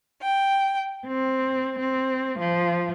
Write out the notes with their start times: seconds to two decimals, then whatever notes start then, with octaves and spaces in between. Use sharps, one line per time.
0.21 G5
1.07 C4
1.79 C4
2.39 F3